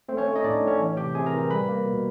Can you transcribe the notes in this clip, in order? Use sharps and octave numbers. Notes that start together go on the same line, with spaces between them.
A3 C4 C5
C#4 C#5
A3
D#4 D#5
A2 D4 D5
A2
C#4 C#5
E3
C3 G4 G5
C3 G#4 G#5
A#4 A#5
E3
G3 B4 B5
A#3
B2